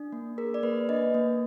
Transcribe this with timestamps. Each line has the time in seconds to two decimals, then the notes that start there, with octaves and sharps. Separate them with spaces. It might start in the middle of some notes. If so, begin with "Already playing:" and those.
Already playing: D4
0.12 A#3
0.38 G#4 A#4
0.54 D5
0.63 A#3 B4
0.89 D4 B4 D#5
1.14 A#3